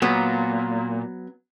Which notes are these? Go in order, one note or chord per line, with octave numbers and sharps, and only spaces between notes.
A#2 F#3 B3